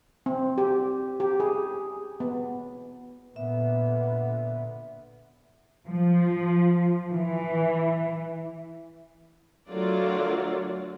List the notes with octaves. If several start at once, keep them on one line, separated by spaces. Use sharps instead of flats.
C4
G4
G4
G#4
B3
A#2 D3 B3 E5
F3
E3
D3 F#3 A3 F4 A#4 D5